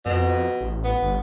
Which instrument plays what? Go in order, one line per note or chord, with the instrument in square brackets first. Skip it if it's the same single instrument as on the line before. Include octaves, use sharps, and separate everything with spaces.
[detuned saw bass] F2 [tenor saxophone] B2
[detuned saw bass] A1
[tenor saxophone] B3
[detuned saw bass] G1